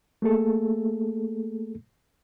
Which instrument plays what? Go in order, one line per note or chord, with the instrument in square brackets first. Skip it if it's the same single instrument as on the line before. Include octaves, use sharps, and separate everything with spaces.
[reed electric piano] A3 A#3 G#4 A4